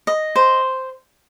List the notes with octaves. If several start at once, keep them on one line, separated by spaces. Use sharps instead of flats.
D#5
C5